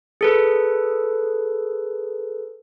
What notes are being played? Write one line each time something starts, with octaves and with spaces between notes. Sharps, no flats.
G#4 A4 B4